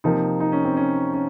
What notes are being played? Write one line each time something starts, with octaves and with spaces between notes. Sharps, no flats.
C3 F3 A#3 D#4
D#4
C#4
C4
C#4
C#4